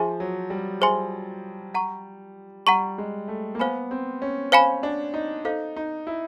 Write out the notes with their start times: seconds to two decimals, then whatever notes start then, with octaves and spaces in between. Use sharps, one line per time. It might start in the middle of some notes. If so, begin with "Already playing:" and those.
Already playing: F3 G#4 C5 E5 G#5 C6
0.20 F#3
0.50 G3
0.81 G#4 C5 E5 G#5 C6
1.75 F#5 A#5 C#6
2.67 G3 F#5 A#5 C#6
2.98 G#3
3.28 A3
3.55 A#3
3.60 B3 C5 F5 G#5 B5
3.91 C4
4.22 C#4
4.52 C#4 C5 F5 G#5 B5
4.83 D4
5.14 D#4
5.45 D#4 A4 C5 F5
5.76 D#4
6.07 E4